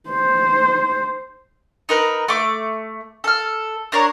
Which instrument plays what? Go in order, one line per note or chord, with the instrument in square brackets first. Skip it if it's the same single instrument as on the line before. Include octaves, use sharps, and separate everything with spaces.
[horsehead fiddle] C5
[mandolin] D#4 A#4 B4
A3 D6
A4 F6
D4 A#4 C#5 A#5